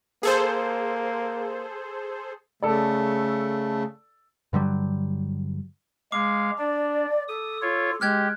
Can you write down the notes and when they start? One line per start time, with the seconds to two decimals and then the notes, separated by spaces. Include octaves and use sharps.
0.23 A#3 G#4 A4 C5
2.63 C#3 A3 A4 D5
4.53 G2 D3 F#3 G3
6.12 G#3 F5 D6
6.58 D4 D5
7.28 A4 D#6
7.62 F4 C#5
8.01 G#3 G4 F6 F#6 G#6